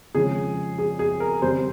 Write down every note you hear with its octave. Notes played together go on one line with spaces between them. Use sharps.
F2 C#3 F3 G#3 C#4 G#4
G#4
G#4
A#4
F2 C#3 G3 C5